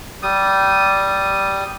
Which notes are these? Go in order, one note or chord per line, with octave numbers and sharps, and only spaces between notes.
G3 D#6